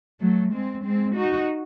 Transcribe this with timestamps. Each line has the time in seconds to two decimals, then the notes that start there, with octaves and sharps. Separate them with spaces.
0.20 F#3 A3
0.52 G#3 C4
0.84 G#3 C4
1.15 D#4 F#4